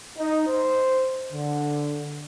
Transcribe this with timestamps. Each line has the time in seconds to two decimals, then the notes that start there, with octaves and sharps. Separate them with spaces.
0.18 D#4
0.48 C5
1.33 D3